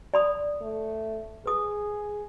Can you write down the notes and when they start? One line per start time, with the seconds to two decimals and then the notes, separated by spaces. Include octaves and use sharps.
0.14 D5 B5 D#6
0.62 A3
1.46 G#4 B4 D#6